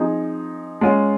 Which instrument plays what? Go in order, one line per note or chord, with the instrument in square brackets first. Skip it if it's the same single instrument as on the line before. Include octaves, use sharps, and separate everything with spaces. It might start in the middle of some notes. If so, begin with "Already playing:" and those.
Already playing: [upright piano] F3 C4 D#4 G#4
G#3 C#4 F4